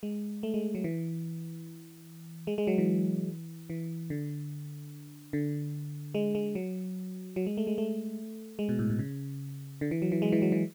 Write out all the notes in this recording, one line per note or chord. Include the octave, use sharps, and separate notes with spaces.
G#3
A3
G#3
F#3
E3
G#3
G#3
F#3
E3
E3
D3
D3
G#3
G#3
F#3
F#3
G#3
A3
G#3
A3
G#3
B2
A2
B2
C#3
D3
E3
F#3
E3
G#3
E3
F#3
E3